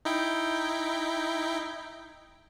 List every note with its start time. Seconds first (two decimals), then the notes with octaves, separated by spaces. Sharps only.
0.05 D#4 E4 G5